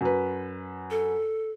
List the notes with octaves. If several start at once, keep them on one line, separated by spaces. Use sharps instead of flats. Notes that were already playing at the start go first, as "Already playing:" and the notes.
F#2 B4
A4